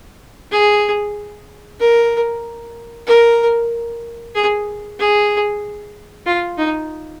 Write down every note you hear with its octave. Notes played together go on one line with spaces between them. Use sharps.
G#4
A#4
A#4
G#4
G#4
F4
D#4